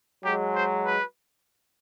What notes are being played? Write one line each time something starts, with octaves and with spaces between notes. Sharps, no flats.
F#3 G#3 G4
C5
B4